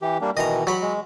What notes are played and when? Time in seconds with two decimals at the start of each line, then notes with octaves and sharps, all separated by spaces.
0.02 E3 G4
0.21 G3 A#3 D4
0.37 B2 D#3 E3 D#5 A#5
0.67 F#3 B5
0.82 G#3